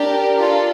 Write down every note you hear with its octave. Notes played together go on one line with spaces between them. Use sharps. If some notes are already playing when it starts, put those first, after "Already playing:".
Already playing: D4 G4 A#4
D4 F4 A4